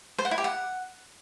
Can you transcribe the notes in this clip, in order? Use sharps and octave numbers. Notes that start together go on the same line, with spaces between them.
C5
F#5
E4
G4
F#5